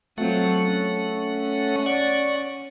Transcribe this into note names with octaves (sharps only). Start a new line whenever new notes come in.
F#3 A3 C4 F4 F#5
C#4
C#4
D5 F#5 C#6